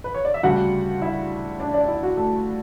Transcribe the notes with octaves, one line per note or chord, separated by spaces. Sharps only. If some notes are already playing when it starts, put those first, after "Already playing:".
B4
C#5
D5
E5
D2 C#3 G3 D4 F#4 F#5
E4 E5
D4 D5
D4 D5
E4
F#4
A3 A4